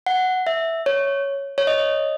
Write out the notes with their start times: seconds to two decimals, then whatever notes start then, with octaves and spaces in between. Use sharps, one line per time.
0.06 F#5
0.47 E5
0.86 C#5
1.58 C#5
1.67 D#5